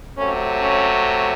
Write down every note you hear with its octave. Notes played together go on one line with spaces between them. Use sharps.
C3 F#3 A3 C#4
C#4